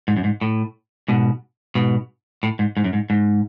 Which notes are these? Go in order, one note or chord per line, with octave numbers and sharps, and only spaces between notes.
G#2
F#2
G#2
A2
G#2 B2
G#2 B2
A2
G#2
G#2
F#2
G#2
G#2